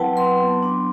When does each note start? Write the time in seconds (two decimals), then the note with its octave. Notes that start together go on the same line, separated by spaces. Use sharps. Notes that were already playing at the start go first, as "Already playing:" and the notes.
Already playing: F#3 C4 E4 B4 F#5 G5 A5
0.17 F#3 C6
0.40 B3
0.63 D4